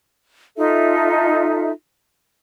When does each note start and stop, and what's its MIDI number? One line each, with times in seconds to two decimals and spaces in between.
0.57 1.71 63
0.57 1.71 65
0.57 1.71 69
0.57 1.71 76